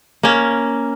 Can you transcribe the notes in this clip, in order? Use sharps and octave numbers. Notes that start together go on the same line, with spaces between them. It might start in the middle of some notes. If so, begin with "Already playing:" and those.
A#3 C#4